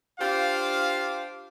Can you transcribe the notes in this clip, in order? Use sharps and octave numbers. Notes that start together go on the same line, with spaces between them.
D4 F4 G4 C5 F5